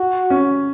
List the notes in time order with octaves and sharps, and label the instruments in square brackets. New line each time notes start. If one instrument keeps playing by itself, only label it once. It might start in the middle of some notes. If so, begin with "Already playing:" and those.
Already playing: [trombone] F#4
[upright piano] C#4